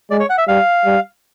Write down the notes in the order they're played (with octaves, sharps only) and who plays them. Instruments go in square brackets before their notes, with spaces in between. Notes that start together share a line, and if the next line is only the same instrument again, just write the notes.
[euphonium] G#3 [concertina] D5
[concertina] C#5
F#5
E5
[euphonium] G3 [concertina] F5
[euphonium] G3